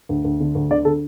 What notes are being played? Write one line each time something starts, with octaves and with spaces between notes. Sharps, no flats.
D2
D2
D3
D2
D3 D5
D3 A4